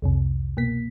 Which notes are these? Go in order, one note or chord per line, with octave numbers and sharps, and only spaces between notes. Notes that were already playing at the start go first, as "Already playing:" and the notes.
C2 F2 C3
B2 A#3 B6